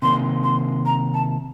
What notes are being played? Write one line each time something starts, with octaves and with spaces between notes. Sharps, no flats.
C3 D#3 A#3 C6
C6
A#5
A5